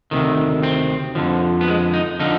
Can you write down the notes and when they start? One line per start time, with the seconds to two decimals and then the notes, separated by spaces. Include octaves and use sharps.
0.11 D2 C3 D#3
0.63 C4
1.15 F2 D3 F3
1.61 B3
1.68 G#3
1.94 D#4
2.19 D3 F3 D#4